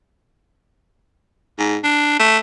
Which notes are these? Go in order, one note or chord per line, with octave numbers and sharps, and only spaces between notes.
G#2
D4
A3